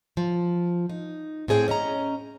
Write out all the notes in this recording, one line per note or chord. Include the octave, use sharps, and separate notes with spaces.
F3
D#4
A2 C4 G#4 C#5 G5
C#4 D#5 E5 A#5